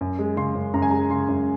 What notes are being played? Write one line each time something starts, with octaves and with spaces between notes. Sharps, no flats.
F#2
G#3
C#3 C6
F#2
F#2 A#5
G#5
G#3 A#5
C#3 C6
F#2